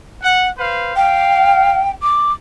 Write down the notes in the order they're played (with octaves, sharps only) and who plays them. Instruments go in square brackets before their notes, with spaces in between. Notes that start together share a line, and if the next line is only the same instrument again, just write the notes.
[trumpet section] F#5
B4 C5 F5
[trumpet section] F5 [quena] G5
[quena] D6